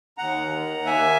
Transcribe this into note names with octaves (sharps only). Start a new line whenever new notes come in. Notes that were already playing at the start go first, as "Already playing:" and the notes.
D#2 F#5 A#5
D#3
D#2
A#3 E5 G#5